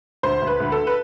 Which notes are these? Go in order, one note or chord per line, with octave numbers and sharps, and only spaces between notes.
D2 C5
D2
B4
D2
A4
B4